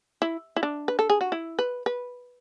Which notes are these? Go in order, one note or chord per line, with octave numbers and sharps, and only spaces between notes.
E4
E4
D4
B4
A4
G#4
F#4
E4
B4
B4